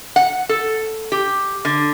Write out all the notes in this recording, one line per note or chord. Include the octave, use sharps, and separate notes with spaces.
F#5
A4
G4
D3